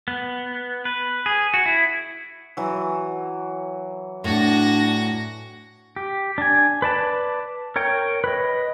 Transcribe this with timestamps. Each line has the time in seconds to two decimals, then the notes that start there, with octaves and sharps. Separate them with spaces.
0.08 B3
0.85 B4
1.26 G#4
1.54 F#4
1.66 E4
2.57 E3 F#3
4.24 A2 D4 F#4 A#6
5.96 G4
6.38 D4 G#5
6.82 B4 D5 A5
7.76 A#4 C#5 G5
8.24 B4 D#5